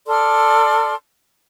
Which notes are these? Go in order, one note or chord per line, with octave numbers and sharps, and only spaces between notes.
A4 D5 C6 F6